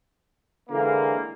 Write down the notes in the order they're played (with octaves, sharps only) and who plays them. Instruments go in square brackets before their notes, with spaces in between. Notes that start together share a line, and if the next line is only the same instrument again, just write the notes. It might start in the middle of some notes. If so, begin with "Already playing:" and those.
[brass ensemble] D3 E3 G#3 A#3